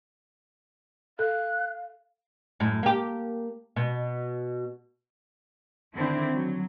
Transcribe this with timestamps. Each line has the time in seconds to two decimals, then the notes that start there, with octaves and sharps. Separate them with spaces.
1.19 A4 F5 F#6
2.60 F#2 A2
2.83 A#3 G4
3.76 B2
5.96 D3 D#3 C4 D4 E4
6.34 F#3